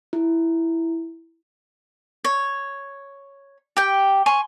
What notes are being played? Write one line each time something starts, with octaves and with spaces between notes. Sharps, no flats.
E4
C#5
G4 G5
G#5 C6 C#6